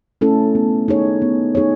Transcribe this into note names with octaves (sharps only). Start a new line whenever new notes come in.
A3 C#4 E4 A4
B3
D#4 G#4 C#5
B3
D#4 G#4 C#5